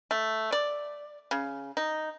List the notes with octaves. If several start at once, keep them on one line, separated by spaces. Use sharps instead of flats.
A3
D5
C#3
D#4